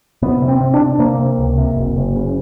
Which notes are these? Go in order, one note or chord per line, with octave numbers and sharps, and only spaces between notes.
C3 B3
C3
C4
C3
D4
C3
C3 A#3
C3
C#2
C3
F#1
F#1
C#3